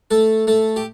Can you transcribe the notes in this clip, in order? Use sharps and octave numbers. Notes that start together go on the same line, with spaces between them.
A3 A4
A3 A4
G4